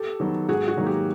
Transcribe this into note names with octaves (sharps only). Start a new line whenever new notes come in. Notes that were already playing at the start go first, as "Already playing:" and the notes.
Already playing: G4 A4
D#3 F#3 B3
G#2 F#4 G#4
F#4
D#3 F#3 A#3
G4